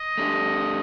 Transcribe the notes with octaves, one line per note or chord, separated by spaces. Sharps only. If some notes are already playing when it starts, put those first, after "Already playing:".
Already playing: D#5
A3 D4 G4